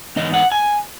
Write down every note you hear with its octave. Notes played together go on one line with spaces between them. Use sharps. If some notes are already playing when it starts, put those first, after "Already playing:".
G#2 E3 B3 D#4 D#5
F#5
G#5